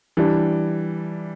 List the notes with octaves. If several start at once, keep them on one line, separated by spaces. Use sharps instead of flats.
E3 G3 D4